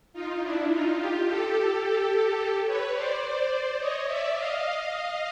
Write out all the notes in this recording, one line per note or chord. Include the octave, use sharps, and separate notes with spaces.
D#4 F4
D4 E4
D#4 F4
F4 G4
G4 A4
B4 C#5
C5 D5
C#5 D#5
D5 E5
D#5 F5